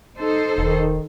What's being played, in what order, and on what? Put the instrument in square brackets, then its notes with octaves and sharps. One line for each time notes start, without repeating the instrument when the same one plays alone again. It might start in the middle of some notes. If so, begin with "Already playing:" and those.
[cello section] D#4 A4 C5
[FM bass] E1 [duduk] D#3